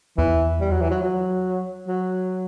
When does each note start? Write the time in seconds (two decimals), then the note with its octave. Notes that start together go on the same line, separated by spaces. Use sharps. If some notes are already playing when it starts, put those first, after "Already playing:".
0.17 E2 E3
0.60 G3
0.71 F#3
0.81 E3
0.90 F#3
1.03 F#3
1.88 F#3